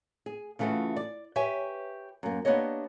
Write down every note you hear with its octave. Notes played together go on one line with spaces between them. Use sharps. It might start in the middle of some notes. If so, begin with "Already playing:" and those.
G#4
C#3 E3 A3 F4 F#4
D5
G4 B4 C#5 E5 G#5
F#2 A#3
A#3 B3 D4 G4 C#5 D#5